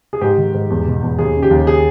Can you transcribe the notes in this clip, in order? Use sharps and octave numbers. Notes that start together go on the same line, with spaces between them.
G#4
G#2 G4
D#3
G#2
E2
B2
E2
D#2 G#4
C#3
G4
D#2
G#4